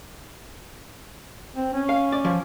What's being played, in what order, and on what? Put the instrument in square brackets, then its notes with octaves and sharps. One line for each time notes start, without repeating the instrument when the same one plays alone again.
[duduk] C4
C#4
[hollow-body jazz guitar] F5
D5
F3